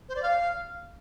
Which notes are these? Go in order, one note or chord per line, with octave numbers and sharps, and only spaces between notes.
C5
D5
F5